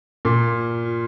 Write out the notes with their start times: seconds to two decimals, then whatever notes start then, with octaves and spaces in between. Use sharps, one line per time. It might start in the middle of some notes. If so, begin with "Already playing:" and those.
0.25 A#2 A#4
0.55 F4
0.86 F4